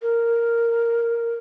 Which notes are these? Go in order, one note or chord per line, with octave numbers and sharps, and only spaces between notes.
A#4